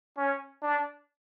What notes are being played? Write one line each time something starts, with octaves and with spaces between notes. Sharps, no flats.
C#4
D4